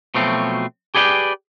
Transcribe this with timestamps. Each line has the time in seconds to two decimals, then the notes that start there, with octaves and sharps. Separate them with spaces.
0.15 B2 F3 F#3 A3 C4
0.95 G4 G#4 B4 D5 F#5 G5